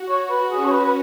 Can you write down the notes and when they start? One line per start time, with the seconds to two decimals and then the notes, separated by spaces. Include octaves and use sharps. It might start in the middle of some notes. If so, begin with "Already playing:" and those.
Already playing: F#4
0.08 C#5
0.30 B4
0.51 C#4 G#4
0.65 C#5
0.71 B4
0.84 B4